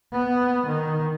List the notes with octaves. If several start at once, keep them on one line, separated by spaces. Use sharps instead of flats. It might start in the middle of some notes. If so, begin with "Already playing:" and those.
B3
D#3